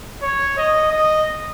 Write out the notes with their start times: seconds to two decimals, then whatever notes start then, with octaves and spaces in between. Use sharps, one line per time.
0.22 C#5
0.57 D#5
0.92 D#5